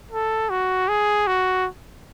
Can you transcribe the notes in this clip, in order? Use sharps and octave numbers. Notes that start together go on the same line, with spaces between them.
A4
F#4
G#4
F#4